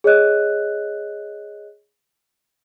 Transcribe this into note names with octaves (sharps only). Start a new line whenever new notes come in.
G#4 C#5 D#5 F#6